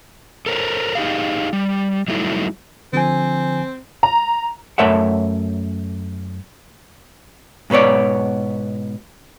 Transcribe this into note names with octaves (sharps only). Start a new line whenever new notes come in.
A4 A#4 C5 C#5
D#4 G4 G#4 F5
G3
F#3 G3 A3 D#4 E4
D3 F3 C4 G#5
A#5
F#2 A3 A#4 C#5 E5 F#5
G#2 B2 B3 C#5 D5